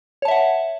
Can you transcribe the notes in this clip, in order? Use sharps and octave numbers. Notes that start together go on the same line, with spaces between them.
C#5 E5 F#5 A5